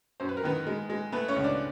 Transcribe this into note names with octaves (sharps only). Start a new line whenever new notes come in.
F#2 C5
B4
A#4
D#3 B3 B4
G#3
G#3
A3 B3 B4
C#4 C#5
C#2
D4 D5